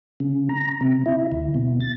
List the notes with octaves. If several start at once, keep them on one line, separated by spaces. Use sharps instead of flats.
C#3
A#5
C3
E4
D2
B2
A6